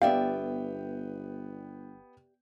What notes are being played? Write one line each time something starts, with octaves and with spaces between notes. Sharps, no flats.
G1 B3 G4 D5 E5 F5 G5